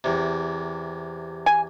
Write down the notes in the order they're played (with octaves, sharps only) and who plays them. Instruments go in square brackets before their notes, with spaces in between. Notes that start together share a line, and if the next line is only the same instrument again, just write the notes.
[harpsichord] E2 C3
[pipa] G#5